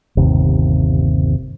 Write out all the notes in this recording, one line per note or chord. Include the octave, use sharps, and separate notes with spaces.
G1 D#2 C3